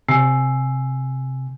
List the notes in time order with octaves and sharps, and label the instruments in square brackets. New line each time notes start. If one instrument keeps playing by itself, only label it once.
[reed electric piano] C3 [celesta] G#5 E6 C7